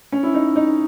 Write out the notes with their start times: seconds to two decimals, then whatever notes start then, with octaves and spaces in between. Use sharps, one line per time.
0.12 C#4
0.23 E4
0.34 D#4
0.56 D#4